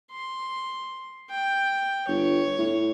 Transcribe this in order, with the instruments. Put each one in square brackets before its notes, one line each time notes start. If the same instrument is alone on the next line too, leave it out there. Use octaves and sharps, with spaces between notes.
[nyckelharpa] C6
G5
[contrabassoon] G1 [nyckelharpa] C#5
[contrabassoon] A2